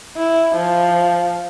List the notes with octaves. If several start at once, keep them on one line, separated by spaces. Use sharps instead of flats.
E4
F3